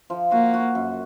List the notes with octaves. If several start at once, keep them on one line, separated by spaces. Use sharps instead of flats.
F3
A#3 F#4
F#4
F#2